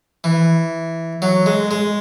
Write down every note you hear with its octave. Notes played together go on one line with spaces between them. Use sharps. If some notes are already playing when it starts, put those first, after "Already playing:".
E3
F#3
G#3
G#3